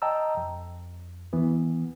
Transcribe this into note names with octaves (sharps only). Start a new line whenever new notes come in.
D#5 G5 A5 A#5 E6
F2
D#2 E3 B3